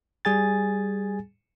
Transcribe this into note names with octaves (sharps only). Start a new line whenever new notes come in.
G3 G#4 G#5 A6